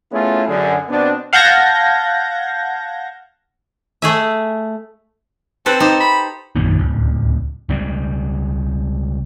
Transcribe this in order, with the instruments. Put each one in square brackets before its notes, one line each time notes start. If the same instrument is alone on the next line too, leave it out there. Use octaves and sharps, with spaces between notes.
[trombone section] A3 B3 C#4 E4 F4 G#4
F#2 D3 G#4
B2 B3 C4 D4
[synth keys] F5 F#5 A5 G6 G#6 A#6
[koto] A3 G#4 E5
[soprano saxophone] C4 [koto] A4 B4 C5
[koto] D#4 G4 C5
[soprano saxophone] B5
[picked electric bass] A#1 F#2 A#2 D#3
D1 C#2
C#2 C#3 G3